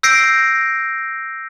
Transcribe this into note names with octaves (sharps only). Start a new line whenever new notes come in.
E6 G6 A#6 C7 D7